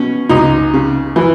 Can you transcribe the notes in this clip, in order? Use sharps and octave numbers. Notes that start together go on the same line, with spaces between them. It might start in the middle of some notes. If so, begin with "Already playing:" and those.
Already playing: B2 C#4
C#2 D#4
C#3
E3